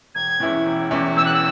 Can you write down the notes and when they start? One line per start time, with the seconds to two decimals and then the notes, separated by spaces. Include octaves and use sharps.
0.14 E1 G#6
0.40 E2 E3 C#4 E4
0.66 E1
0.91 E2 E3 C#4 E4
1.16 E1 E6
1.25 F#6
1.34 E6